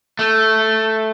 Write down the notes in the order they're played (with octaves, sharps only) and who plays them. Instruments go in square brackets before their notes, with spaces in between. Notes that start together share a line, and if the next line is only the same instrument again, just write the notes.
[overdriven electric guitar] A3